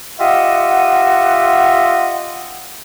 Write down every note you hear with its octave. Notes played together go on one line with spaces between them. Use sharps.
F4 G4 D#5 E5 F#5